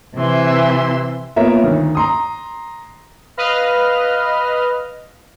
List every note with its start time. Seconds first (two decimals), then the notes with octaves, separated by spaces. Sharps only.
0.16 C3 E3 E5 C6
1.36 A#3 B3 F4 A#4 C#5 E5
1.64 D2 D#3
1.95 A#5 C6 D#6
3.37 B4 D#5 F5 F6